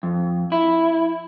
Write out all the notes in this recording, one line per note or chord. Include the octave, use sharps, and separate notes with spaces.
F2
E4